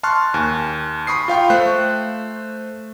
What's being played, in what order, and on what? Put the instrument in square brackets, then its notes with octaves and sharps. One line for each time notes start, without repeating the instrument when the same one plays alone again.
[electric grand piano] A5 C6 C#6 F6 F#6
D#2 G#5
B5 C#6 D#6 C7
F4 F5 G5 C#6
A3 C5 F#6